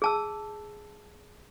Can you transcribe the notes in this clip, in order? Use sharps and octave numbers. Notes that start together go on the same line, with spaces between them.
G#4 A5 E6